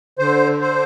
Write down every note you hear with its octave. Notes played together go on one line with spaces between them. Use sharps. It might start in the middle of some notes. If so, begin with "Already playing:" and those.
D3 C5
C5